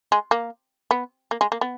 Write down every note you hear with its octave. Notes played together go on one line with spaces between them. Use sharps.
G#3
A#3
B3
A#3
G#3
A#3
B3